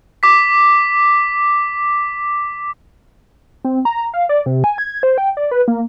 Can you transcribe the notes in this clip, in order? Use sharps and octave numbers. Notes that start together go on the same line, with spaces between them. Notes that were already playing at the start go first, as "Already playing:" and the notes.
D6 B6
C4
A#5
F5
D5
C3
G#5
G#6
C5
G5
D5
B4
A#3